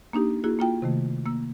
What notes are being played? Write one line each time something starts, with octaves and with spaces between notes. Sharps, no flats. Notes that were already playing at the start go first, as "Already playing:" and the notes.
A#3 D4 D#4 G4
A#3 E4 F#4 G#4
A#3 F4 G5
C3 D#3 A3
A#3 E6